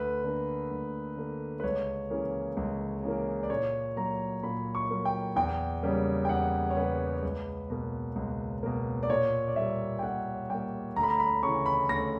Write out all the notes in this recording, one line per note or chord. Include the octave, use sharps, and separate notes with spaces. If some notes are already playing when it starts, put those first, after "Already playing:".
Already playing: D2 B4
D3 A#3
D2
D3 A#3
B4
C#2 C#5
C#3 E3 A#3
C#2
C#3 E3 A#3
D5
A#2 C#5
F#3 A#3 A#5
A#2 B5
C#6
F#3 A#3
G5
E2 G5
C#3 G3 A#3
G5
E2 F#5
C#5
C#3 G3 A#3 B4
C#2
B2 A#3
C#2
B2 A#3
D5
A#2 C#5
D5
G3 A#3 E5
G5
A#2 F#5
G3 A#3 G5
D2 A#5
B5
A#5
B5
C#3 E3 C#6
B5
D2 A#6